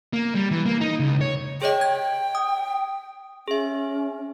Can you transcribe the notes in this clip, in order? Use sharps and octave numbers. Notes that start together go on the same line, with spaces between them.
A#3
G3
E3
A#3
D#4
C#2
C#5
G#4 C#5 D#5 G5
G#6
D#6
C#4 G#4 E5